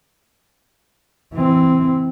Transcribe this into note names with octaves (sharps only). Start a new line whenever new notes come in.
E3 C4